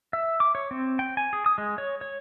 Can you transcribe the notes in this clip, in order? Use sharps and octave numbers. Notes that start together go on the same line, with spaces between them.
E5
D6
C#5
C4
G5
G#5
G#4
D#6
G#3
C#5
C#5